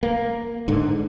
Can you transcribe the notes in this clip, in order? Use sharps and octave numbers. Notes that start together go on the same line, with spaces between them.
A#3
G#2 D3